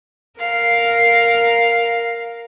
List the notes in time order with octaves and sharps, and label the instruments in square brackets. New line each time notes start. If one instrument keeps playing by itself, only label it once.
[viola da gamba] A#4 [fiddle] F5